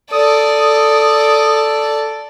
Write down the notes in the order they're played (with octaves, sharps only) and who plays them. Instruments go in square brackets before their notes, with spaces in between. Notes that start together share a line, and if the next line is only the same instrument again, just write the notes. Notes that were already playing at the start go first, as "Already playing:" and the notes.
[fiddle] A4 D5 [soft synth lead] D#6